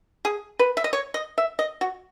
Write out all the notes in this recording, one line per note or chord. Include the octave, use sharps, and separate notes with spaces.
G#4
B4
E5
D#5
C#5
D#5
E5
D#5
F#4